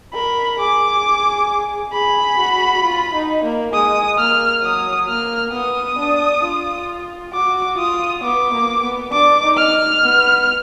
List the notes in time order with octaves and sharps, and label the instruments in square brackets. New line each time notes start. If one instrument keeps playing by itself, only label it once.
[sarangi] A#4 [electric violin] B5
[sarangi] G#4 [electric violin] D6
[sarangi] G#4 [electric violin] B5
[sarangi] F#4
F4
D#4
A#3
[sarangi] G#3 [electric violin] D#6
[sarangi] A#3 [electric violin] F6
[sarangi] F#3 [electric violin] D#6
[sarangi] A#3 [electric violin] F6
[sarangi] B3 [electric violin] D#6
[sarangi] D4
F4
[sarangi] F#4 [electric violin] D6
[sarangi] F4 [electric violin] D#6
[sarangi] B3 [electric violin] D6
[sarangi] A#3
B3
[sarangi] D4 [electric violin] D6
[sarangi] D#4
[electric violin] F6
[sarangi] B3